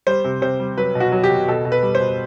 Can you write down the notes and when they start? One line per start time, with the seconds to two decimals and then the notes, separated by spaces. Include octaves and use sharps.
0.07 G3 C5
0.24 C3
0.42 C3 C5
0.60 G3
0.77 F#3 B4
0.95 B2
1.00 F#4
1.12 F#3
1.24 G4
1.29 B2
1.48 B2 A4
1.65 B2
1.72 B4
1.82 G3
1.95 C5
2.00 B2